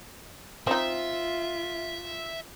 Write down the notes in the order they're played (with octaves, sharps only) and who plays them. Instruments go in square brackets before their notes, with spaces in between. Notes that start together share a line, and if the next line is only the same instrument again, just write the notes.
[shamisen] C4 D#4 [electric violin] F4 [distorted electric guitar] E5